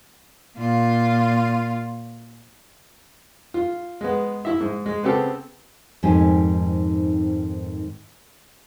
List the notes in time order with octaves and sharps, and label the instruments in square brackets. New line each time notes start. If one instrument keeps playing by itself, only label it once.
[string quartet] A#2 F4
[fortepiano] F4
G#3 B3
E4 E5
G#2
G#3
C#3 B3 C4 G4 A4
[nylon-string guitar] F2 G#2 D#3 C4 G4 G#5